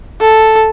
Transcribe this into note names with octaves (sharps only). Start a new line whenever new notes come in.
A4